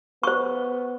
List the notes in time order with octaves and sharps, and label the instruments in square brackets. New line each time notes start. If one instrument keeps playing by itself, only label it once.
[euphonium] B3 [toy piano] C5 C#6